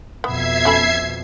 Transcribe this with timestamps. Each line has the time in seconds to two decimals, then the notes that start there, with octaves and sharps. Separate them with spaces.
0.24 F2 B2 B3 E5 G#6 C7
0.65 C#4 A4 B5